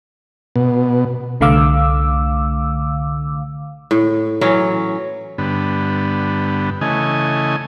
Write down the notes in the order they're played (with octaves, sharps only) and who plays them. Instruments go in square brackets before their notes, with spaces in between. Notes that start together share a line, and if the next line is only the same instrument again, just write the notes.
[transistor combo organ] B2
[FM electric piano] C2 D3 A3 F5 D6 E6
[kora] A2
E3 F#3 C#4
[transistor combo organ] G2 D3 B3
C#3 E3 A3 D#5 G#5